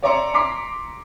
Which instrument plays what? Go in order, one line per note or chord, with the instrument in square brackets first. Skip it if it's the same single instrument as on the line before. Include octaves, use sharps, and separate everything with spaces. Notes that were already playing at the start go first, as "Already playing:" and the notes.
[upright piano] C#5 D5 E5 A#5 C6 C#7
A#5 C6 D6 B6 C7